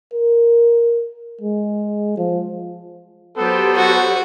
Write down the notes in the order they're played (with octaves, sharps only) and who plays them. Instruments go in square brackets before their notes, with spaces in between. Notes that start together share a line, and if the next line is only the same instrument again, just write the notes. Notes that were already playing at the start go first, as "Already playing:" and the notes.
[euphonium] A#4
G#3
F3
[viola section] F#3 G4 C5 [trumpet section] B3 A4
[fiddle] F#4